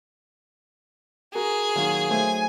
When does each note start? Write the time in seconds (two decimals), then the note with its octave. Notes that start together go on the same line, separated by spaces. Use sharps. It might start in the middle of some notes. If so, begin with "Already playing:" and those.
1.35 F#4 G#4 A#4
1.76 A#2 D#3 F#3
2.10 A3 C5 G#5